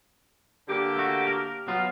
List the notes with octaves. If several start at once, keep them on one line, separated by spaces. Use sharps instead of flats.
D3 A#3 G4
A3 F#4
A#4
F#3 B3 F4